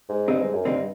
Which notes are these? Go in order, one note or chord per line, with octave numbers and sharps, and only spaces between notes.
G#2
G2 D3 G3 C4 D#4
G#2
F#2
G2 D3 G3 C4 D#4